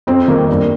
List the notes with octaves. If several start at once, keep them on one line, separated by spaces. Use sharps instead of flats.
F2 C4
D#3 A#3
G2